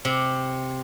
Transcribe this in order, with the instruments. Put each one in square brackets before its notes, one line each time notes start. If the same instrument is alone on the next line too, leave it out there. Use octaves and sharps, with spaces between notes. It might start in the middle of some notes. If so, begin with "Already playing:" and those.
[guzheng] C3 C4